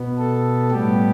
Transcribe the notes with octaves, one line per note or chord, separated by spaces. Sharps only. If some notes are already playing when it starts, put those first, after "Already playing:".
Already playing: B2 B3
A4
A2 G3 B3 G4